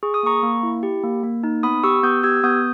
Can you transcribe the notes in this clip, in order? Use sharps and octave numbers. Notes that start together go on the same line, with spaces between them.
G#4 C#6
D#6
A#3 A#5 C#6
A#3
E4
G4
A#3
A#3
D#4
B3 B5 D#6
G4 C#6 E6
B3 D#6 G6
G4 E6 G#6
B3 D#6 G6